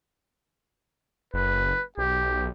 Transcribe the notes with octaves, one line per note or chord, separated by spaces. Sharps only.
F#1 B4
B1 G4